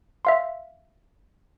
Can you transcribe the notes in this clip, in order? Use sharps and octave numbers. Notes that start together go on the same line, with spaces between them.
E5 F5 C6